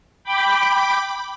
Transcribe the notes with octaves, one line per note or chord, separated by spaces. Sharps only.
G5 B5 D6